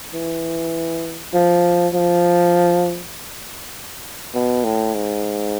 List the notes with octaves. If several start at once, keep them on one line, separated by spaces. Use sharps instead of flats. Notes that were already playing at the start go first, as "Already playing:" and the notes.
E3
F3
F3
B2
A2
G#2